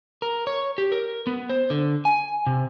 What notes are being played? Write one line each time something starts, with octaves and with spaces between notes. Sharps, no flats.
A#4
C#5
G4
A#4
B3
C5
D3
G#5
C3